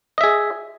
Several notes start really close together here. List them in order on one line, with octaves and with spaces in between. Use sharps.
D#5 E5 G#4